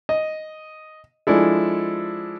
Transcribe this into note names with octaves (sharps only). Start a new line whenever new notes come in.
D#5
F3 G#3 D4 E4 A4